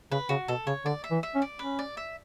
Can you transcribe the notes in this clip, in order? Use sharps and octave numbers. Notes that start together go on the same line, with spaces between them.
C#3 B4
C#3 F#4
B2 A4
C#3 C#5
D3 D5
E5
E3
E5
C#4
D5
C#4 B4
D5
E5